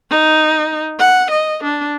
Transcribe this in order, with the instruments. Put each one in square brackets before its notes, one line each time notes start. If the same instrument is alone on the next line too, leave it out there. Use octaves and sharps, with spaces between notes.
[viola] D#4
F#5
D#5
D4